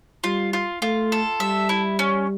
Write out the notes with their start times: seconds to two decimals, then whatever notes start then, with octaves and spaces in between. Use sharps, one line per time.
0.24 G3 F4
0.53 F4
0.82 A3 F4
1.12 A4
1.40 G3 E5
1.69 E4
1.99 C#4